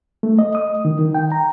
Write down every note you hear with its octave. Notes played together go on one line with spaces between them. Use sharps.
A3
D#5
D#6
D#3
D#3
G5
A#5